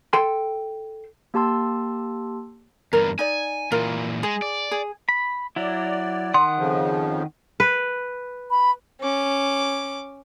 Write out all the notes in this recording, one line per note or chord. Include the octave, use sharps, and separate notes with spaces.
A4 G5 C6
A#3 G4 A5 C6 E6
E2 G2 A#4
D#4 D5 G#5
A#2 E3 F4 A#4
G#3 G#4
D5
G#4
B5
F#3 E4 D5
D#3 F#5 C6 D#6
F2 C#3 F3
B4
B5
C#4 D6